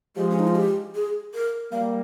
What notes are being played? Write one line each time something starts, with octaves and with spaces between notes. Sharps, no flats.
F3 G#3 G4
C#4
D#4
F4
G4
G#4
A#4
G3 A#3 F5